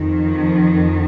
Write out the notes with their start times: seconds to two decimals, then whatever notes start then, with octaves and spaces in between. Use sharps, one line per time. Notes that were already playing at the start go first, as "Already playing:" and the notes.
Already playing: F2 D#3
0.31 F3